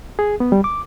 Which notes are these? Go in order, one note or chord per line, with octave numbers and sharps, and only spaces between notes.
G#4
B3
G3
D6